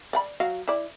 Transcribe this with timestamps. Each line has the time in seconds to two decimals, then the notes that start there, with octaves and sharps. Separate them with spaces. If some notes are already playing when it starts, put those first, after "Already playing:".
0.13 D5 F#5 B5
0.40 F#3 F#4 F5
0.68 E4 D5